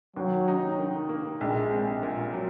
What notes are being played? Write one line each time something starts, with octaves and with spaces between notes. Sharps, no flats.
D#2 F#3
D#4
D#3
A#3
A#1 G#3
C4
A#2
F#3